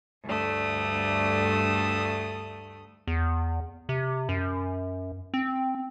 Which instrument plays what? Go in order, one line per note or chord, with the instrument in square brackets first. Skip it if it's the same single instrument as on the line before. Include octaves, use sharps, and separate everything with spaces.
[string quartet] D2 G2 A3 D#6
[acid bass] E2
C3
F#2
C4